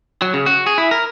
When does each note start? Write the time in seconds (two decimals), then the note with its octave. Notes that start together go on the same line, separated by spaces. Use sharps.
0.22 F#3
0.34 C#3
0.46 F#4
0.66 G#4
0.78 E4
0.91 A#4